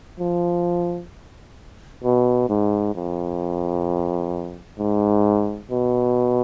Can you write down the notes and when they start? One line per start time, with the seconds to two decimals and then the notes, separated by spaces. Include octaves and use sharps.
0.20 F3
2.04 B2
2.49 G#2
2.95 F2
4.79 G#2
5.71 B2